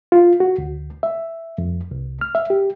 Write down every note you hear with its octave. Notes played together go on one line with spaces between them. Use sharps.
F4
F#4
D2
E5
F2
C2
F6
E5
G4